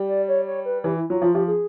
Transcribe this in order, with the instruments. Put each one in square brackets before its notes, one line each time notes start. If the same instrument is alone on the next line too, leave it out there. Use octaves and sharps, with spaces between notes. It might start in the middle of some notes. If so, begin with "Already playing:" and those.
Already playing: [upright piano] G3
[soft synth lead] D5
C#5
C#5
B4
[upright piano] E3 [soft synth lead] G4
[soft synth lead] E4
[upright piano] F#3 [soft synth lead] F4
[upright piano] F3 [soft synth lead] F4
[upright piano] F3 [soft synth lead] G4
[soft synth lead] G#4